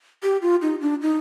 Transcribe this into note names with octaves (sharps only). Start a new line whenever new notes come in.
G4
F4
D#4
D4
D#4